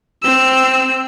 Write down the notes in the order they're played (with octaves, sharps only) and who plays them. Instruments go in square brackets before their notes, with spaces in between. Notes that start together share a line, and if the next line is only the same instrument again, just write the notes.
[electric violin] C4 E6